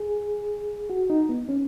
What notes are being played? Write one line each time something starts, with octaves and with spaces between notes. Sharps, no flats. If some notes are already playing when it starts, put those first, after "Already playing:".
Already playing: G#4
F#4
D#4
B3
C#4